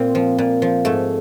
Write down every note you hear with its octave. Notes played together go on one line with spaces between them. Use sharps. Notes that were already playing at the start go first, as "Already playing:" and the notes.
Already playing: A#2 C4
F3
A#2
F3
G#2 A3